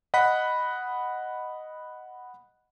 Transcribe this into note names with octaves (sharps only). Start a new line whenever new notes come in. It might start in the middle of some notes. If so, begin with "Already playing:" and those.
D#5 F#5 B5 F#6 B6